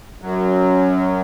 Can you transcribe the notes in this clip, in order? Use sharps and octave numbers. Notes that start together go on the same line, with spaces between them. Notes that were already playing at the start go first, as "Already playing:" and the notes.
F#2 F#3